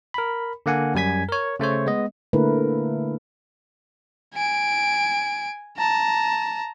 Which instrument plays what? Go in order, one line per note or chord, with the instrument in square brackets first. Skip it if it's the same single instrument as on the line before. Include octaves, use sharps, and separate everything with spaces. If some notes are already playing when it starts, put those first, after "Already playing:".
[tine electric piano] A#4 B5
D3 A#3 F#5 G#5
F#2 G3 G#5 G#6 B6
A#4 C#5
C#3 A3 C5 C#5
G#3 B3 D#5
[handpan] D3 A3 A#3 E4 A#4 B4
[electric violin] G#5 D7
A5 A#5